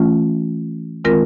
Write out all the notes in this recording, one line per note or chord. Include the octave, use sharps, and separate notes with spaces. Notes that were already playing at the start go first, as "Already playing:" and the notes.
Already playing: E3 A3 C#4 F4
D#3 G#3 C4 F4 A#4